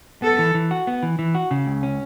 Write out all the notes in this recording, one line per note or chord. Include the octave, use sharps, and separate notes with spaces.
B3 A4
E3
E3
F#4
B3
E3
E3
F#4
C#3
C#2
C#4